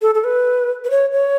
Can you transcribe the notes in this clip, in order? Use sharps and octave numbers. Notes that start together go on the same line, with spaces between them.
A4
A4
B4
B4
C#5
C#5